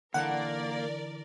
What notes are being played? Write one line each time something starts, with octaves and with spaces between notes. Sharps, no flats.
D3 E3 A#3 A4 A#4 D5 F#5